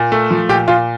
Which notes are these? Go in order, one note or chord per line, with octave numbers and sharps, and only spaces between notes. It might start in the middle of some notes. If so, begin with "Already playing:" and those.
Already playing: A#2
A3
F3
A#2 G4
A#2 F4